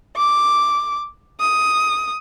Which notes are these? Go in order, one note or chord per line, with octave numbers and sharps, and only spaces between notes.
D6
D#6